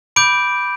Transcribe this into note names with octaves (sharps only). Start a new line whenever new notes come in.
B5 D6 G6 D7